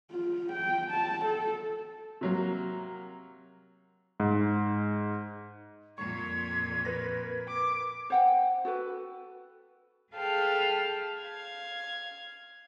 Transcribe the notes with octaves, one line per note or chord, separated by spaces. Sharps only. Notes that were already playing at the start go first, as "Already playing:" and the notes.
F4
G5
A5
A4
C3 F#3 A#3
G#2
F2 A#2 C#6 G#6
A#4 B4 A#6
D6
C5 F#5 G5
F#4 A4 B4
G#4 A4 B4 F5 G5 A5
F5 G#6